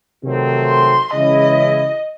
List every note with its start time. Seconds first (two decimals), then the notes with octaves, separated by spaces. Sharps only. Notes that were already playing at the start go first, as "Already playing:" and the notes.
0.22 C3 D#3 F#3 A3 C4
0.67 C6
1.12 C#3 E3 G#3 C#4 E4 D#5